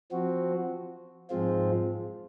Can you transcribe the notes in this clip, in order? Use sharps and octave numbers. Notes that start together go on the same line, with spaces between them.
F3 C4 F#4
G#2 F3 G#3 C4 F4